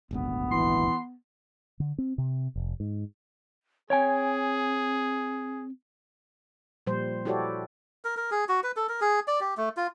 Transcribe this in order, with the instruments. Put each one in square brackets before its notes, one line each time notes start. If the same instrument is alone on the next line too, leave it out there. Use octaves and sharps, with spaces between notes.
[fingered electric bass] D#1 G#1 D2 [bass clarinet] B3
[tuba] E3 [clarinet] C6
[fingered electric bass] D3
C4
C3
F1
G#2
[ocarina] C4 [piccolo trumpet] G#4 [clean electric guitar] C#5 G5 G#5
[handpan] A#2 F3 G3 C5
E4 F#4 G4 A4 C#5 D5
[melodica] A#4
A#4
G#4
F#4
B4
A4
A#4
G#4
D5
G4
A3
F4